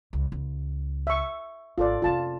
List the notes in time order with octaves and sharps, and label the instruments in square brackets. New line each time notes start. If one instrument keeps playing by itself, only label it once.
[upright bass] C#2
C#2
[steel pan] E5 C#6
[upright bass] G#1 [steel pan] F4 A4 D5
[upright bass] F1 C#4 [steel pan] F4 A5